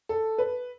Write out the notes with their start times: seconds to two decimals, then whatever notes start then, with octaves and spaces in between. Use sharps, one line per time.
0.09 A4
0.38 B4